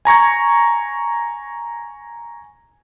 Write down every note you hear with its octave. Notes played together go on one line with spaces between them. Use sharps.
G#5 A#5 C#6 G#6